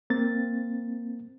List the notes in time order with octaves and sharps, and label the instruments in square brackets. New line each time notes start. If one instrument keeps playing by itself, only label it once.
[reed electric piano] A#3 C4 A6